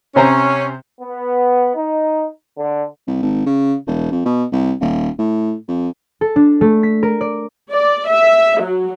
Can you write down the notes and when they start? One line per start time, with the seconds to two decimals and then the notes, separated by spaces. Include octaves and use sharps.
0.16 C3 C#4 C5 A#5
1.01 B3
1.75 D#4
2.58 D3
3.07 C2
3.22 G#1
3.46 C#3
3.87 E1
4.11 F2
4.25 B2
4.52 C2
4.81 D#1
5.18 A2
5.68 F2
6.21 A4
6.36 D4
6.61 A3
6.83 B6
7.03 A#4
7.21 D5
7.71 D5
8.09 E5
8.61 F#3